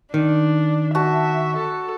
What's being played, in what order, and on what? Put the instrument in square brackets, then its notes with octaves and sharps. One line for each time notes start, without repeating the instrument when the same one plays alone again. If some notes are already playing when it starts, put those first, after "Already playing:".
[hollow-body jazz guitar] D#3 [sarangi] D4
[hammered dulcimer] F#4 A5 [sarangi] E5
[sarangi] A4